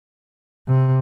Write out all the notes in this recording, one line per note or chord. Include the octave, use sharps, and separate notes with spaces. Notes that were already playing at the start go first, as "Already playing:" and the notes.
C3